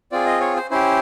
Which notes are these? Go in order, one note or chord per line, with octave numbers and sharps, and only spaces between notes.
C4 F4 G#4 D5
D#5
C#5
C5
C#4 E4 G4 C5